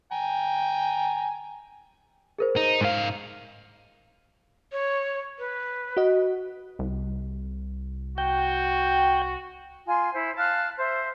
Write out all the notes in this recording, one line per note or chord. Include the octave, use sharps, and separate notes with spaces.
G5 G#5 A#5
G#4 A#4 C5
D#4
G#2 F5
C#5
B4
F#4 D#5
C2
F#4 G5
F4 G#5 C6
E4 C5
F5 A5 F6 F#6
C5 E5